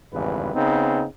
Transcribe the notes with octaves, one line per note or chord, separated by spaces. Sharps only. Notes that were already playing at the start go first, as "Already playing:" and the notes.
G#1 E2 G2 C#3 B4
C#3 B3 C4 D#4